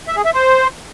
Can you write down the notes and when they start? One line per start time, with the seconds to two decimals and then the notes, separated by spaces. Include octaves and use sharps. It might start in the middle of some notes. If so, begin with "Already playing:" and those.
0.08 E5
0.16 G#4
0.25 E5
0.34 C5